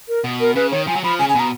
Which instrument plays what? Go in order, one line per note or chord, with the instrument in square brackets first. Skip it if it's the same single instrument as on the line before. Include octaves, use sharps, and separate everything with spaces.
[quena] A#4
[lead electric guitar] B2
[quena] A#4
[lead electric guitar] C#3 [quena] B4
[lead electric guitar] D#3 [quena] C#5
[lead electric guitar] F3 [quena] G#5
[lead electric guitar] F#3
[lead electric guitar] F3 [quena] B5
[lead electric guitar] C#3 [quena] G#5
[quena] G#5
[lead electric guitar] B2 [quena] A#5